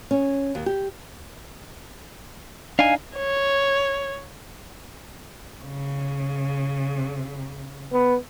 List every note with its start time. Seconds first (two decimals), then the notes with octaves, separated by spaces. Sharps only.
0.11 C#4
0.55 D#2
0.66 G4
2.79 D4 D#4 F5 G#5
3.16 C#5
5.63 C#3
7.92 B3